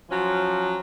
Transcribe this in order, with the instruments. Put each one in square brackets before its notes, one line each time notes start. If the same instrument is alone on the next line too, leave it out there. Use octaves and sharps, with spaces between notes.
[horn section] F3 F#3 C#4